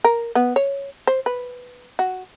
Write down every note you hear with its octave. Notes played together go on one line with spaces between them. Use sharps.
A#4
B3
C#5
C5
B4
F#4